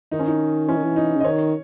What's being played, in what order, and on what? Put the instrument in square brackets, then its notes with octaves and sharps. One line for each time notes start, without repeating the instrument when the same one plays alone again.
[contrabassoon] D#3 [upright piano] D#4
[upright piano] C#4
D#4
[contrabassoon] E3 [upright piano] C#4
[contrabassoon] D#3
E3
[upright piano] D#4
[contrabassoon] C#3
[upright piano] D#5
[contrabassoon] D#3 [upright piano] C#5